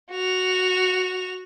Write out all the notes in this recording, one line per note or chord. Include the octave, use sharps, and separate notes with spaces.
F#4 F7